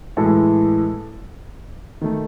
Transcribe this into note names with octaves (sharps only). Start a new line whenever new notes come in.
A2 E3 G#3 A4
D#3 A3